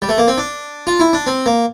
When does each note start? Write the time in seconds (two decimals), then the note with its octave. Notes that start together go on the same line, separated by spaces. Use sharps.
0.02 G3
0.09 A3
0.18 A#3
0.28 C4
0.38 D4
0.87 F4
1.00 E4
1.13 D4
1.27 C4
1.46 A#3